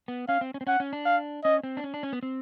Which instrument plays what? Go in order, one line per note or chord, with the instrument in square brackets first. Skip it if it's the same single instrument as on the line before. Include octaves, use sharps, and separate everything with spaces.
[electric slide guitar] B3
[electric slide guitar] C#4 [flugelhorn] F5
[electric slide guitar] C4
C#4
C4
[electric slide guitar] C#4 [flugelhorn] F#5
[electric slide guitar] C#4
D4
[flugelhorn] F5
[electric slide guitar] C#4 [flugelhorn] D#5
[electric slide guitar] C4
D4
C#4
D4
C#4
B3
C4